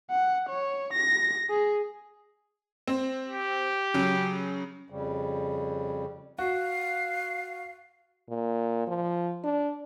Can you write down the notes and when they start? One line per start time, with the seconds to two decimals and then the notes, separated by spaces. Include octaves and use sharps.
0.11 F#5
0.49 C#5
0.93 A#6
1.49 G#4
2.87 C4 C5
3.26 G4
3.94 C#3 F#3
4.90 F2 C#3 G3
6.38 F#4 F5
8.29 A#2
8.87 F3
9.44 D4